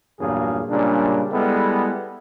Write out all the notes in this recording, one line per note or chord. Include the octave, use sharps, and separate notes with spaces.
E2 G2 A#2 F#3 F4 G#4
A#2 C#3 G3 G#3 D4
G3 G#3 B3 E4 G#4 A4